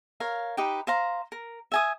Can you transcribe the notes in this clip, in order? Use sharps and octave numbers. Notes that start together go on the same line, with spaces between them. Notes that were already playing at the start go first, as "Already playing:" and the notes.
A#4 C#5 F5
D#4 G4 B4 G5
C5 F5 A#5
A#4
E5 G#5 D#6